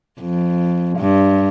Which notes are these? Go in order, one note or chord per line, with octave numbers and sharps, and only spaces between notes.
F2
G2